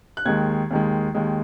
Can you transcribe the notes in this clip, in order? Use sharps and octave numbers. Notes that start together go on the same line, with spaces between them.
F#6
D#2 D#3 G#3 G#6
D#2 D#3 G#3
D#2 D#3 G#3